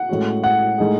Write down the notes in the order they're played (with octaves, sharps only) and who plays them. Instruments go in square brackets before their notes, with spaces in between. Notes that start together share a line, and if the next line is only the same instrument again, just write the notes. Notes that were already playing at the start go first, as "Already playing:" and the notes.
Already playing: [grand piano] F#5
[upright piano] A2 G#3 C#4 F#4
[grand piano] F#5
[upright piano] A2 G#3 D#4 G#4